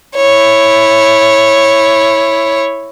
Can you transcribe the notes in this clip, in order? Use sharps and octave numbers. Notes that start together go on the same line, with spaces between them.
E4 C#5